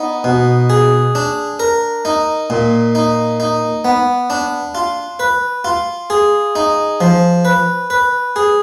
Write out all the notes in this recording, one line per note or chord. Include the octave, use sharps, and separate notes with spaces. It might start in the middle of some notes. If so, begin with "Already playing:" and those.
Already playing: B3 D#4
B2
G#4
D4
A#4
D#4
A#2
D#4
D#4
B3
D4
F4
B4
F4
G#4
D#4
F3
B4
B4
G#4